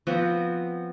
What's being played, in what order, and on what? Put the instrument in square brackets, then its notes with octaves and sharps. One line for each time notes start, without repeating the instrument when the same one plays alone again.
[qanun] F3 B3 C4 F#4